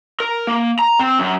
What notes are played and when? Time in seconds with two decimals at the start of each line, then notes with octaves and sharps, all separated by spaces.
0.20 A#4
0.47 A#3
0.79 A#5
0.99 C4
1.19 F#2